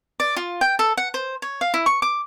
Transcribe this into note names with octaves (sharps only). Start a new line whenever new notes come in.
D5
F4
G5
A4
F#5
C5
C#5
F5
E4
C#6
D6